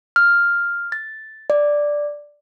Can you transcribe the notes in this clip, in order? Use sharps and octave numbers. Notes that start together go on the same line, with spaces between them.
F6
A6
D5